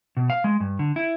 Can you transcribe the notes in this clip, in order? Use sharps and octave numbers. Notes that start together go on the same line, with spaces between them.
B2
F5
G#3
G2
D3
E4